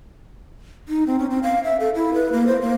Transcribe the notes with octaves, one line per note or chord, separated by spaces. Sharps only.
D#4
C4
C#4
C4
F5
E5
A4
E4
B4
A#3
C5
A#3